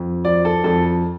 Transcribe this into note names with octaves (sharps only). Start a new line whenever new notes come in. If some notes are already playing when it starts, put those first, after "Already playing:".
Already playing: F2
F3 D5
A4
F2 A4